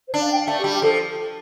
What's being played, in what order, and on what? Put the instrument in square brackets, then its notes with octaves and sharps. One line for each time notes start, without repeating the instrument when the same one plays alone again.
[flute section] C5
[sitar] D4 [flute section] D5
[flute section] F5
G5
F5
[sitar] A3 [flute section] D5
[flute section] G4
[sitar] G3
[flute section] G4
[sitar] F3 [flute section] A4